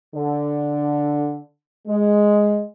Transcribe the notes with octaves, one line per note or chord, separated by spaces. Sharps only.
D3
G#3